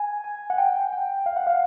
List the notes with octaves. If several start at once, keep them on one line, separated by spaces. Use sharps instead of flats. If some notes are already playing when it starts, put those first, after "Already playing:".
Already playing: G#5
G#5
F#5
G5
G5
F5
F#5
F5